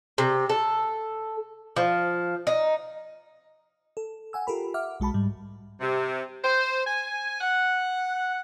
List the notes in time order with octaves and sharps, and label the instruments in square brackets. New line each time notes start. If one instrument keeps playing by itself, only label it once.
[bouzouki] C3
A4
F3
D#4
[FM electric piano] A4
F#5 G#5 E6
F4 G4 A4 A#4 B5
E5 F#5 D6 F6
B1 G#3 F#4 A5 B5
G#2 G3
[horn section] C3
C5
G#5
F#5